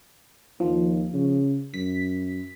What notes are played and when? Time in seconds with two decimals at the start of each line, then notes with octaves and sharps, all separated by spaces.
0.60 D#2 F3
1.14 C#3
1.74 F#2 B6